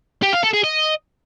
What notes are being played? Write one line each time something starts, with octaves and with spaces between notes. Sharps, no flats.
G4
F5
A4
G#4
D#5